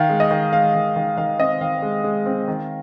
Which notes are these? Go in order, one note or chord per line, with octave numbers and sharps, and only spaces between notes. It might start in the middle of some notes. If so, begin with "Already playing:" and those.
Already playing: D#3 F5
G#3
D#5
D#3
G#3 F5
D#3
D#3
D#3 F5
C4 D#5
D#3 F5
G#3
G#3
C4
D#3